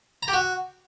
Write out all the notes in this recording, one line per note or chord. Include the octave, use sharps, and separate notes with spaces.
A#5
G4
F#4